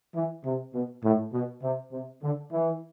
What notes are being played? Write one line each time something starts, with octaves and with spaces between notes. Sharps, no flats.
E3
C3
B2
A2
B2
C3
C3
D3
E3